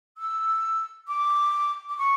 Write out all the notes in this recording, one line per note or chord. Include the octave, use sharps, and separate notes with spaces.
E6
D6
D6
C#6